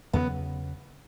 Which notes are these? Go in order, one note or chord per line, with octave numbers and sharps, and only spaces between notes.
E2 C#3 F#3 B3